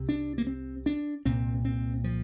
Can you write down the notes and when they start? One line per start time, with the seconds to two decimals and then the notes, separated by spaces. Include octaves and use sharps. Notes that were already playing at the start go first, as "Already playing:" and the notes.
Already playing: C2 C3
0.09 D4
0.38 A#3
0.47 C4
0.86 D4
1.25 C2 A#2 C4
1.65 C4
2.04 F3